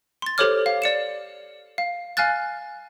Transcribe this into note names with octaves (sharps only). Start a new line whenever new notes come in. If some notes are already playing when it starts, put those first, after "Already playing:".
C6 A6
G4 A4 C5 C#5 D6 F6
F5
D5 C#7 E7
F5
F5 G#5 F6 F#6 A6